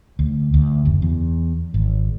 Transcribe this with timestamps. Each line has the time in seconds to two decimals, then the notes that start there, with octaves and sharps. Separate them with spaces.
0.19 D2
0.54 D2
0.85 F#1
1.02 E2
1.74 G#1